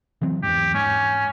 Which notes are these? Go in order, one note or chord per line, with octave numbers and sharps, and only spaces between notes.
E3 F#3 C4
E2 G#2 G4
G#2 C#4